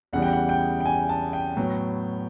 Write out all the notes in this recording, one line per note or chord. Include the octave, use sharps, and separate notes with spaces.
E2 C#3 E3 G3 F#5
G5
F#5
G5
G5
G#5
A5
G5
A2 F#3 B3